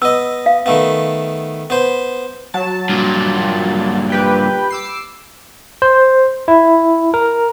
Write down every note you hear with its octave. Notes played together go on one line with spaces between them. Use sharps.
B3 D#5 E6
F5
D#3 A3 B3
B3 C5
F#3 A5
G2 A#2
G4 B4 G5
D6 E6 C7
C5
E4
A#4